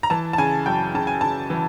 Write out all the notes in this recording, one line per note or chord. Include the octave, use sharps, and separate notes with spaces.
A#5
E3 A5
A5
C#3 G#5
F#2 G5
C#3 A5
G#5
C#3 A5
E3